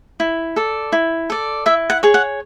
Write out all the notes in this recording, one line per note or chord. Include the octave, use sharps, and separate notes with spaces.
E4
A4 D5
E4
A4 D5
E4 E5
F#5
G#4 C#5
F#5